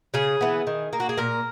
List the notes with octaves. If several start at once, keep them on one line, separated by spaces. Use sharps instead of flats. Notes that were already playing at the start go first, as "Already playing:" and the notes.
C#3 G#4
E3 B3
D#3
A#3
F#4
G#4
A#2 A#4